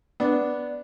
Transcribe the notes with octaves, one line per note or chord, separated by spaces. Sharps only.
B3 D4